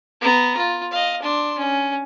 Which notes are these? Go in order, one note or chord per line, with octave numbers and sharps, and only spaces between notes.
B3 A#5
F4
D#5 F5
D4 C6
C#4